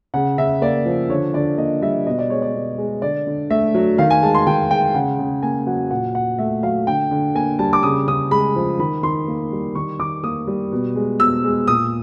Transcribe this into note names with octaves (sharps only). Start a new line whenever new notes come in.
C#3 F#5
C#3 E5
A#3 D5
F3
D3 C#5
D3 D5
A#3 D#5
G3 E5
B2 D#5
D5
G#3 C#5
D5
B2
G#3
D3 D5
D3
A3 E5
F#3
D#3 F5
G#5
G#3 A5
C6
D#3 G5
G#3 G5
C#3 F#5
C#3
A#3 G#5
F#3 F#5
A#2 F#5
A#2 F#5
A3 E5
F#3 F5
D3 G5
D3
A#3 G#5
G3 A5
D6
C#3 D#6
C#3 D#6
G#3 B5
F3
D#3 B5
D#3 C6
A#3
G3
D#3 C#6
D#3 D6
A#3 D#6
G3
B2
G#3
B2 E6
G#3
A#2 D#6